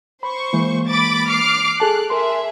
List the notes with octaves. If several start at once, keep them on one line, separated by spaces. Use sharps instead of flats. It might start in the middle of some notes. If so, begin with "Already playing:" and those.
C5 B5 C#6
E3 G#3 A#3
B5 D6 A6
D6 F6 C7
G#4 A4 A5 F#6
G#4 A#4 E5 C6